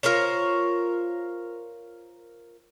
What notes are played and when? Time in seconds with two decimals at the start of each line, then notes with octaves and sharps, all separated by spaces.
0.03 F4 A#4 C5 C#5